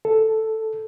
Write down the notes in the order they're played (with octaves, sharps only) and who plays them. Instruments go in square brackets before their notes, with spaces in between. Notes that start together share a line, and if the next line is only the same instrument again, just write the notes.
[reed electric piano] A4